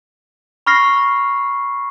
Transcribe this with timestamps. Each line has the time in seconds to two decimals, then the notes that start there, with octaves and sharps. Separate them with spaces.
0.67 B5 C#6 F6 A#6 C7